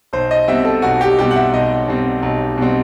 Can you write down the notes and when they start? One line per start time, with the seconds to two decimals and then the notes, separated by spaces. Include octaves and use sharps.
0.13 B1 C5
0.31 D#5
0.48 B2 G3 C4 E5
0.65 A4
0.82 B1 F#4
1.01 G4
1.18 B2 G3 C4 G4
1.31 F#5
1.36 E5
1.53 B1 D#5
1.88 B2 G3 C4
2.23 B1
2.58 B2 G3 C4